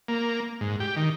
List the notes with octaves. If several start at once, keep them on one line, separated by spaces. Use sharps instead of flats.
A#3
G#2
G4
D#3